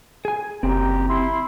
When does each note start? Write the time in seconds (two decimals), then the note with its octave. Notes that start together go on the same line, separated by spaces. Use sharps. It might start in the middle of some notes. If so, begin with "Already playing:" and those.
0.25 G#4 G#5
0.63 F#1 C4 G4 A#5
1.07 E4 C6